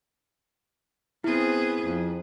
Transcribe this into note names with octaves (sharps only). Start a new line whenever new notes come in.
B3 C4 E4 G#4
F2